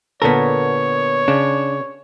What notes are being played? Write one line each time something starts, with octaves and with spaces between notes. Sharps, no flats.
A#2 D3 B3 A4 A#4 C#5
C#3 D4